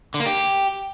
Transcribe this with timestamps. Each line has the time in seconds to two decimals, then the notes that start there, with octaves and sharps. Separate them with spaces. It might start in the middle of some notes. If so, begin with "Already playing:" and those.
0.14 D3
0.20 A#3
0.26 G4